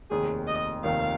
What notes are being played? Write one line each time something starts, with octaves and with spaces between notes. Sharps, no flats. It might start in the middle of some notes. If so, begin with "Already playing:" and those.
F1 D#2 D#3 G#4
D#5
F1 D#2 D#3 F5